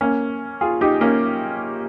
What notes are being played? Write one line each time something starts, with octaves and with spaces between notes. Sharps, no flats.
A#3 C#4
F4 G#4
D#4 G4
A#3 C#4